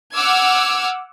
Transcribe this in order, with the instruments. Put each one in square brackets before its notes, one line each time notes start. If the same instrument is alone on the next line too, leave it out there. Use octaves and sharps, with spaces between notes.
[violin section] F#5 D6 E6 F6 G#6